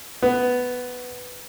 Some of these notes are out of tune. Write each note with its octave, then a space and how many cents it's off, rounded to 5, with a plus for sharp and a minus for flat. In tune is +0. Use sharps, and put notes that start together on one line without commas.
B3 +5